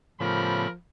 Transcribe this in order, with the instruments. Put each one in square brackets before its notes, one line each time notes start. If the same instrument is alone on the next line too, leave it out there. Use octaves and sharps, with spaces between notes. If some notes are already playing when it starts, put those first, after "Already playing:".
[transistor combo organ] A2 C#3 B3 [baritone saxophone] F3 [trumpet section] G3 A#4 B5